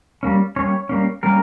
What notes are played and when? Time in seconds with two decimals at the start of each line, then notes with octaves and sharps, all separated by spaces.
0.23 G3 A#3 C#4
0.56 G3 A#3 C#4 C#5
0.89 G3 A#3 C#4
1.23 G3 A#3 C#4 A#4